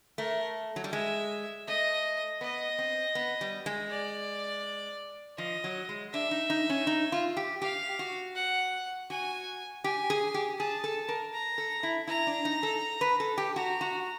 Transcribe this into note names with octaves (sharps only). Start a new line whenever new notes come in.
A3 A#4
F#3
G3
G#3 E5
A3 D#5
B3 D#5
C4
B3
G3
G#3
D5
F3 D#5
F#3
G#3
D4 E5
D#4
D#4
C#4
D#4
F4
G4
G4 F5
F#4
F#5
F#4 G#5
G4 G#5
G#4
G4
G#4 A5
A4
A#4
A#5
A4
E4
E4 A#5
D4
D#4
A4
B4
A4
G4
F#4 A#5
F#4